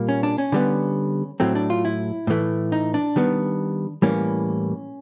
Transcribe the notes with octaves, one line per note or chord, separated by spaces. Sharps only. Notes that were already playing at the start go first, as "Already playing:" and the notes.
Already playing: A#2 G3 A#3
C#4
D4
C#4
D3 G3 B3
A2 F#3 A3 C4
D4
F4
E4
A2 E3 A3
D#4
D4
D#3 G3 B3
A2 E3 G3 A#3 C#4